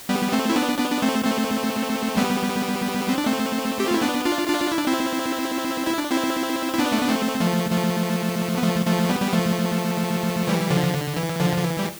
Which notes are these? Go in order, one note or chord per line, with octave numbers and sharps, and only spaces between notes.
G3 B3
A3 C4
E4
B3 D4
B3 D4
D4
A3 C4
A3 C4
G3 B3
C4
D4
A3 C4
G4
F4
E4
B3 D4
D4 F4
D4 F4
E4
D4
C4 E4
E4
D4
C4 E4
E4
B3 D4
A3
B3
A3 C4
F3 A3
F3 A3
B3
F3 A3
F3 A3
G3 B3
G3
F3 A3
E3 G3
D3 F3
D3
E3
D3 F3
D3
E3
G3